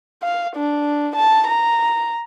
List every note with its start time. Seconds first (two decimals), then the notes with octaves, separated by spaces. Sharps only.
0.22 F5
0.56 D4
1.16 A5
1.47 A#5